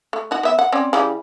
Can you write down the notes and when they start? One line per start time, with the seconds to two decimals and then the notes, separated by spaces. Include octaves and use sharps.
0.13 A3
0.31 D#4 F#4
0.43 B3 E5
0.59 F#5
0.72 C4 C#4 D5
0.93 C#3 E3 G3